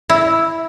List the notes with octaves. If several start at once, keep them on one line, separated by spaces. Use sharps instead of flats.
E4